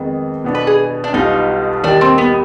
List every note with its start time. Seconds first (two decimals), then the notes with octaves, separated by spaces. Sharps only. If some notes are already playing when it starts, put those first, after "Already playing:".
Already playing: F2 D#3 G#3 B3
0.44 B2 B3 D4
0.55 B4
0.67 G#4
1.04 D4
1.13 B1 B2 G3 B3 D#4 F4
1.84 D#2 D#3 G3 D4
2.01 C4
2.18 B3